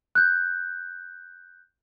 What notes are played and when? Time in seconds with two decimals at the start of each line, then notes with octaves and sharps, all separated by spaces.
0.15 F#6 G6